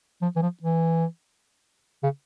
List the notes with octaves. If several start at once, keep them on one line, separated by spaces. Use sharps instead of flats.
F3
E3
F3
E3
C#3